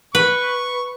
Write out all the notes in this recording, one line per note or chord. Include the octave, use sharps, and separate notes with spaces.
B4 C#6